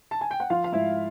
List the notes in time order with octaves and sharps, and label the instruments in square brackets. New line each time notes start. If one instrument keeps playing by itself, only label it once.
[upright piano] A5
G#5
G5
F#5
F3 F4 F5
F5
G#2 E4 E5